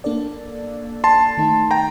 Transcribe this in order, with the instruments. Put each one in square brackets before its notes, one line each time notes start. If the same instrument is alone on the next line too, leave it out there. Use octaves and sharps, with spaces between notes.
[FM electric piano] A#3 D4 A4 D5
[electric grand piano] A5 C6
[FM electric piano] D#3 A3 D#4
[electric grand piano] G5 A#5